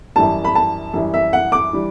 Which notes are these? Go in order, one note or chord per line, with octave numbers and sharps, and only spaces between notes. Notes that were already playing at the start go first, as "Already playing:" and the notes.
F#2 E3 G3 A5
B5
A5
F#2 E3 G3
E5
F#5
D6
E3 G3